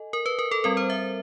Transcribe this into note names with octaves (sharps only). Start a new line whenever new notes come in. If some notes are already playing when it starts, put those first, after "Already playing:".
Already playing: A4 D#5 G#5
A#4
B4
A#4
A4
G3 C4 A#4
C5
E5